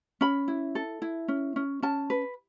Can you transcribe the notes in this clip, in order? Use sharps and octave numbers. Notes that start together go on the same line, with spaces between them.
C#4 B5
E4
A4
E4
C#4
C#4
C#4 A5
B4